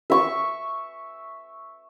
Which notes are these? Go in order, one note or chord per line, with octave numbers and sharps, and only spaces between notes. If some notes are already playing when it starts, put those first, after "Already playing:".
E5 C#6